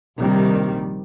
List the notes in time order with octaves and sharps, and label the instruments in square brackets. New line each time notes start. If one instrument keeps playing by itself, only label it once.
[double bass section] A#1 C3 D#3 G3